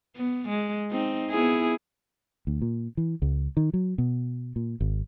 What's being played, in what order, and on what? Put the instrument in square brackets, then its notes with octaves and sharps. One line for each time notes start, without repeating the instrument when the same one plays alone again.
[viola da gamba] B3
G#3
C4 D#4
B3 E4 G#4
[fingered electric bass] D2
A#2
E3
C#2
D#3
F#3
B2
A#2
G#1